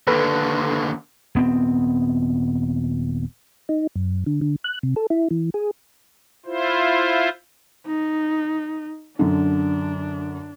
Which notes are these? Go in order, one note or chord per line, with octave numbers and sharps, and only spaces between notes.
D#2 D3 A4 B4
D#1 B3 C4
D#4
F#2
D3
D3
F#6
C3
A4
E4
E3
G#4
E4 F4 C5
D#4
F#2 D3 D4